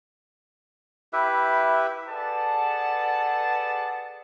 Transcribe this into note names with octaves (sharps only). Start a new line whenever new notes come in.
E4 G4 B4 E5
G#4 A4 B4 D5 F#5 A5